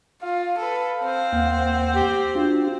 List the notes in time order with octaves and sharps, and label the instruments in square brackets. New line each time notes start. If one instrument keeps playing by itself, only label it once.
[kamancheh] F4 [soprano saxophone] F5
[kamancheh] A4 B4
C4 C5
[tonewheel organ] D#2 A#3 F#5
[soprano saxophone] G4
[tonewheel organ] D4 F#4 [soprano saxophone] F4